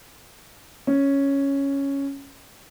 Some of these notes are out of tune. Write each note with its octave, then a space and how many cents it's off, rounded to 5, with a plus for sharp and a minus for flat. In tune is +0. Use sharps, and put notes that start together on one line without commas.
C#4 +0